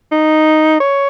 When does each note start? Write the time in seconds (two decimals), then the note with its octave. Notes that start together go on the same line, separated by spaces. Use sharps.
0.12 D#4
0.80 C#5